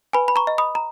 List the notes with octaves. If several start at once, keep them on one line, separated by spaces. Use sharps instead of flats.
B4 G#5 B5
B5
A#5 C#6
D#5
B5 D#6
A#5